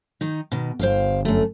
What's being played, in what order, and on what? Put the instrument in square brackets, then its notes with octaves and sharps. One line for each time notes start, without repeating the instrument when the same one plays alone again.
[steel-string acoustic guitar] D#3 D#4
B2 D#3
[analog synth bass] G1 [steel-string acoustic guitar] C5 F5 G5
[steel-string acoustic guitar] F#2 A3